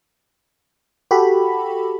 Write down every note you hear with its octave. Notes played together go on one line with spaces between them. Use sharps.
F#4 G4 A4 B5